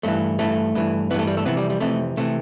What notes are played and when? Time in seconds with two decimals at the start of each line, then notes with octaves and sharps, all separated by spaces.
0.03 G2 E3 A3
0.39 G2 E3 A3
0.75 G2 E3
1.11 E3 B3
1.14 G2 A3
1.27 G3
1.37 A3
1.45 F2 C3 E3 B3
1.57 G3
1.70 G3
1.80 F2 C3 E3 A3
2.17 C3 E3 A3